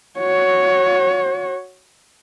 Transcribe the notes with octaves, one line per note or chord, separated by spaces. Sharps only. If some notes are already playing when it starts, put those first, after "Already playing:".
F#4 C#5